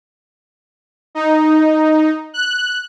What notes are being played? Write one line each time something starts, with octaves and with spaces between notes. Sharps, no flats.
D#4
F#6